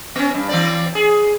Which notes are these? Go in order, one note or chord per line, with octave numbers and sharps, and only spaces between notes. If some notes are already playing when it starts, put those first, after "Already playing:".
B3 C#4
G2
E3 C4 D5
G#4